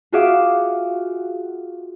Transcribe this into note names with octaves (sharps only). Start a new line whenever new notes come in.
F4 F#4 G#4 E5 F5 D6